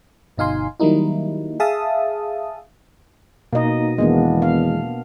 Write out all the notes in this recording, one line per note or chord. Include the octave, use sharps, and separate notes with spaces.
G1 B2 D#4 F5 G#5 C6
D#3 F#3 G3 A#3 D#4 E4
G#4 E5 F5 A5 D#6
B2 A#3 D#4 D#5
E2 D#3 G#3 A#3 B3 D4
F5